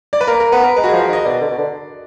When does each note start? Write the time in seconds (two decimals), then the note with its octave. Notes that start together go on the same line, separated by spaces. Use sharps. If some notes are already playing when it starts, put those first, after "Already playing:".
0.13 D5
0.21 B4
0.27 A#3 A#4
0.40 A#4
0.52 B3 B4
0.64 A#4
0.76 G#3 B4
0.84 F#4
0.88 F3 G#4
1.01 B4
1.08 D#3
1.13 D#5
1.25 B2 D5
1.41 D3
1.50 B2
1.58 D3